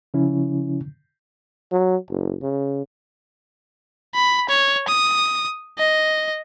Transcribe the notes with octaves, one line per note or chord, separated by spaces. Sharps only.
C#3 F3 C#4 E4
F#3
F#1
C#3
B5
C#5
D#6
D#5